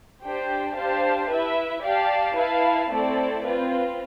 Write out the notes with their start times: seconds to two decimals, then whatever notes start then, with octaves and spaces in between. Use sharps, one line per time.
0.22 D4 G4 C5 G5
0.76 D4 G4 C5 F5 A5
1.30 E4 B4 E5
1.83 G4 D5 F5 A5
2.36 E4 B4 F5 A5
2.90 A3 C4 E4 A4 D5
3.44 C4 F4 B4